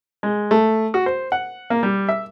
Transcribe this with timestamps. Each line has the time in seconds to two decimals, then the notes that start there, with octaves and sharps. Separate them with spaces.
0.23 G#3
0.51 A3
0.94 F#4
1.06 C5
1.32 F#5
1.70 A#3
1.83 G3
2.09 E5